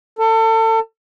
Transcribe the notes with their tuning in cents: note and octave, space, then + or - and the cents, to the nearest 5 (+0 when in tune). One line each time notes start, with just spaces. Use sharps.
A4 +30